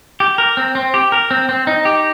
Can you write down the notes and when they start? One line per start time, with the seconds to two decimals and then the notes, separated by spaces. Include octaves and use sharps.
0.20 G4
0.38 A#4
0.57 C4
0.75 C4
0.94 G4
1.12 A#4
1.31 C4
1.49 C4
1.67 D#4
1.85 G4